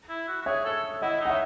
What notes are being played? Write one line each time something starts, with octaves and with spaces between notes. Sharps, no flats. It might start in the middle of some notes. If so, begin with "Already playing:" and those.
E4
F#4
F#4
G#4 C#5 E5
A4
E4 D#5 F#5
D#4 F#5
C#5 E5